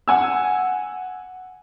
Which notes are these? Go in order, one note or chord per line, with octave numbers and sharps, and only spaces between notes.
F#5 G#5 E6